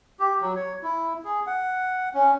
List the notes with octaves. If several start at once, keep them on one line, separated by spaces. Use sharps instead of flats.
G4
F#3
C#5
E4
G#4
F#5
C#4